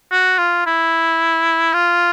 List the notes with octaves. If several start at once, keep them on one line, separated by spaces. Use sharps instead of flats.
F#4
F4
E4
F4